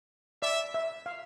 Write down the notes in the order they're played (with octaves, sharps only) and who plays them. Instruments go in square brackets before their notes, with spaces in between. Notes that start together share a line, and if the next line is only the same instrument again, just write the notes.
[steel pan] D5 [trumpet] E5
[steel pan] E5
F5